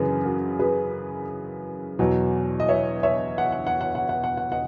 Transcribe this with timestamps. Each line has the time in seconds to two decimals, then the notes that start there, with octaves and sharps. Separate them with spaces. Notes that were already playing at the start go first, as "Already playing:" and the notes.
Already playing: F#2 C#3 E3 G#4 B4
0.24 F#4 A#4
0.59 G#4 B4
1.99 E2 B2 F#3
2.60 D#5
2.68 C#5 E5
3.03 C#5 E5
3.38 F#5
3.52 F#5
3.67 F#5
3.81 F#5
3.95 F#5
4.09 F#5
4.24 F#5
4.37 F#5
4.52 D#5 F#5